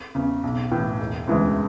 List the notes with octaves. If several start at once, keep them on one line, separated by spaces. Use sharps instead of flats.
E2 C#3
B1
A2 E3
E1
D2 C#3 E3 G#3